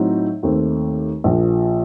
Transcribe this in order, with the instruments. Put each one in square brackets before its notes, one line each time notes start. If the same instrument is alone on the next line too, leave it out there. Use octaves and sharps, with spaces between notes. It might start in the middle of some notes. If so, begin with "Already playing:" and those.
Already playing: [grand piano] A2 F#3 C4 D#4
D#2 D#3 A3 C4
A#1 A#2 F3